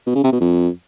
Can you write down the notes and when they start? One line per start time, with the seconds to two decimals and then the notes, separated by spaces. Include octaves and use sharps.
0.07 B2
0.15 C#3
0.24 C3
0.32 B2
0.41 F2